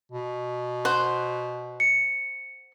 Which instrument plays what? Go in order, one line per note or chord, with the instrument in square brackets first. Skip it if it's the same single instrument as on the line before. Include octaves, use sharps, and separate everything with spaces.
[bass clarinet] B2
[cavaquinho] C5 F#5 C6
[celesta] C#7